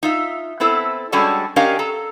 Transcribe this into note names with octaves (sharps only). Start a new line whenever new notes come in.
D#4 F4 E5
B3 C4 E4 A4
G3 G#3 C#4 D4 F#4 A4
C#4 D4 G4 A#4 D#5 F5
A4 A#5